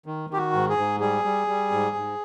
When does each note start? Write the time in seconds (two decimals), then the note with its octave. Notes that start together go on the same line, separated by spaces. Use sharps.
0.06 D#3
0.30 D#3 G4
0.37 F#4
0.53 G#2
0.69 G#4
0.77 G#2
1.00 G3 G#4
1.25 G3
1.48 G3
1.71 G#2
1.96 G#2